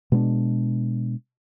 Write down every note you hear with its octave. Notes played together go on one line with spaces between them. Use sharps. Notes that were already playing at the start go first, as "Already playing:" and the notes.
B2 G#3 A#3 D4